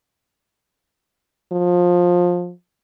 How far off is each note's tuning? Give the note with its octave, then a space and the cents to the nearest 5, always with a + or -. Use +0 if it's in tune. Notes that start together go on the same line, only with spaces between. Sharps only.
F3 +20